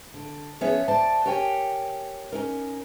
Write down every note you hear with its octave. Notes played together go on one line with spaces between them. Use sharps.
D3
F3 B3 C#4 G#4 C#5 E5
C5 D5 A5
G4 A#4 C#5 G5 G#5
C#4 D#4 A#4